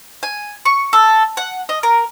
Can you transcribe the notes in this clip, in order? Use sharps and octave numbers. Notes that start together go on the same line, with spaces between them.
G#5
C#6
A4
F#5
D#5
A#4